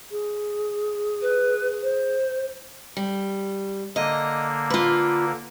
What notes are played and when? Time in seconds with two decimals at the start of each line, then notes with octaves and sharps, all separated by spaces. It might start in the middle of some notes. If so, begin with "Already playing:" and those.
0.11 G#4
1.22 B4
1.82 C5
2.97 G3
3.96 D3 A#3 D#5
4.70 F4 B4